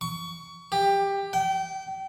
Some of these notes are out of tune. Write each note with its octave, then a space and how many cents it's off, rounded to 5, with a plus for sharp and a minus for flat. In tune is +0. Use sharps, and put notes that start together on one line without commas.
C#6 +25
G4 +15
G5 -30